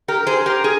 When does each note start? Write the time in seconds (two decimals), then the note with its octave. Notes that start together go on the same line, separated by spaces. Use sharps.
0.08 G4 A#4
0.27 G#4 C5
0.46 G4 A#4
0.64 G#4